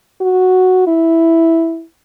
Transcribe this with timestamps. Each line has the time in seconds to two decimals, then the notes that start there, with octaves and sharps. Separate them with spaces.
0.21 F#4
0.87 E4